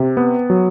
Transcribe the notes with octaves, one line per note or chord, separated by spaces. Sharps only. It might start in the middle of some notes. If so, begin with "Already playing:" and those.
Already playing: C3
B3
F#3